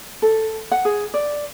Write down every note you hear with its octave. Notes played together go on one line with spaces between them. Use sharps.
A4
F#5
G#4
D5